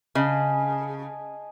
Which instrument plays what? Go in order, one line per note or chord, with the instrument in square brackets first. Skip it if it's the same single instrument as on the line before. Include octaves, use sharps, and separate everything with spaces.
[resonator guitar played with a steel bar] C#3 [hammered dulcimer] G#4 D#5 A5